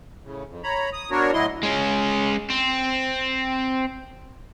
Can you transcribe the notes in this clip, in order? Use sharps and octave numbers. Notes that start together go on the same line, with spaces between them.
A2 C#3
F2
C#5 A#5 B5
D#6
B3 D4 F#4 A#4 C#5
A2 F#3 E4 D#5 C6
G#3 C#4
C4